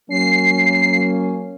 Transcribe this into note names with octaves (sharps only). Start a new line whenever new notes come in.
F#3 A#3 C#4 C7